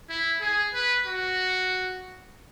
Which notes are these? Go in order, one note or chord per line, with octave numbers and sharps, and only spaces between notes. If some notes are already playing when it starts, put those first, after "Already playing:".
E4
G#4
B4
F#4